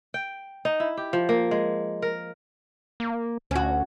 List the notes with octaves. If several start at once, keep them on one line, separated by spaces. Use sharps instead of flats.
G5
D#4
E4
G4
F3
A#3
G#3
A#4
A#3
D2 C#4 F#4